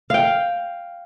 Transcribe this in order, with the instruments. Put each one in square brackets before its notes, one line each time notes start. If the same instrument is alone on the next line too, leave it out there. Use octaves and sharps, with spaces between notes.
[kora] F5 G5